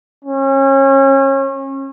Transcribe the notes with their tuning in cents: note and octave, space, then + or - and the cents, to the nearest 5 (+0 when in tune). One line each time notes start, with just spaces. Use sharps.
C#4 -30